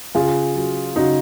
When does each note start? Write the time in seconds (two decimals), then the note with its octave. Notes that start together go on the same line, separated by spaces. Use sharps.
0.15 C#3 F4 G#4
0.55 F#3
0.96 C#3 D#4 F#4